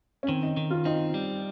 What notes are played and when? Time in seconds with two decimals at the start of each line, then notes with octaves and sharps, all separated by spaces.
0.23 C#4
0.28 D#3 C4
0.43 D#4
0.57 D#3
0.71 F4
0.85 C4 D#4
1.14 G3